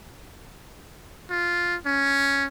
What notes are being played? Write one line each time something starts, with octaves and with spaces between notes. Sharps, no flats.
F4
C#4